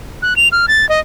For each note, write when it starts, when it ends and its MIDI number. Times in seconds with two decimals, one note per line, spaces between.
0.22 0.36 90
0.36 0.48 101
0.52 0.66 89
0.68 0.88 93
0.89 1.00 75